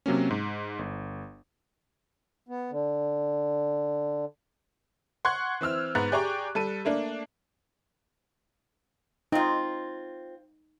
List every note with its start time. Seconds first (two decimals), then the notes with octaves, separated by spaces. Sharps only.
0.06 C3 F#3 A#3 C#4
0.30 G#2
0.79 G1
2.49 B3
2.71 D3
5.25 F#5 C6 C#6 F#6 G#6
5.61 E3 C4 E6 F6
5.95 G#2 B3 A#5 F#6 A6
6.12 G4 G#4 D5 G5 A#5 C#6
6.55 G3 A4 D#7
6.85 A3 A#3 D4
9.32 C4 D#4 F4